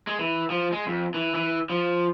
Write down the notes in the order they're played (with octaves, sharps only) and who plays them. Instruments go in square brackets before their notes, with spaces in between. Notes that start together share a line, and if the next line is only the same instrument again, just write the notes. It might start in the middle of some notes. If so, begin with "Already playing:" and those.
[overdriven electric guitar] G#3
E3
F3
G#3
F2
E3
E3
F3